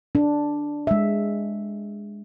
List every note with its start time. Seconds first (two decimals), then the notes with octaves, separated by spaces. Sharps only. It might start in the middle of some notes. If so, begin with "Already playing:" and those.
0.15 D4
0.87 G#3 E5